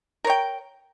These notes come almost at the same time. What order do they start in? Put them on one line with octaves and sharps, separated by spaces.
A#4 C#5 G5